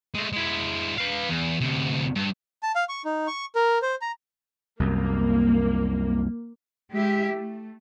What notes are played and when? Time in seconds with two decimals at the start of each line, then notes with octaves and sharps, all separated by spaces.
0.14 G#3 A3
0.33 G#3 E4
0.98 B4 F5
1.29 E2
1.61 D2 C3
2.16 G2
2.63 A5
2.75 F5
2.89 C#6
3.05 D#4
3.27 C#6
3.55 A#4
3.82 C5
4.01 A#5
4.80 C2 F#2 A#3
6.94 G#3 E4 G4 E5
7.31 A3